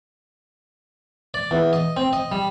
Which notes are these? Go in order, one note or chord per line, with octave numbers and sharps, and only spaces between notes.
D5
E2
D#5
C4
D#5
G3